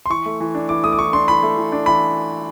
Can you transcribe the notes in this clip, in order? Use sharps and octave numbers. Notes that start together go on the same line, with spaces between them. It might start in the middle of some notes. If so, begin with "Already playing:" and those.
C6
E3 C#6
A3
E3
D4
E3 D6
A3 D#6
D6
E3 C#6
D4 C6
E3 B5
A3
E3
D4
E3 B5